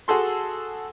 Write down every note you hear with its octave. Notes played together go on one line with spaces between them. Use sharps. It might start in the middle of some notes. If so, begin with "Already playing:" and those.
F#4 G#4 A4 C6